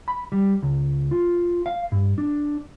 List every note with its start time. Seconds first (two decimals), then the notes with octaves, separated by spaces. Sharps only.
0.08 B5
0.32 G3
0.62 C#2
1.11 F4
1.66 F5
1.92 G2
2.18 D4